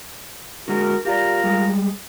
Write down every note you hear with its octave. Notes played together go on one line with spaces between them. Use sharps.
D3 G#3 F#4 G#4 A#4
F4 G4 A#4 D5 A#5
G3 G#3